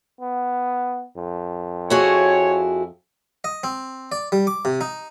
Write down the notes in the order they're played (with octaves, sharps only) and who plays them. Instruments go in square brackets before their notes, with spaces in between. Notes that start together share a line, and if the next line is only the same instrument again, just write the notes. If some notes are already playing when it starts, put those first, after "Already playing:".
[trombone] B3
F2
[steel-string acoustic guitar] E4 F#4 G#4 [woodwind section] C#5
[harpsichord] D#5
C4
D5
G3
D6
C3
D#4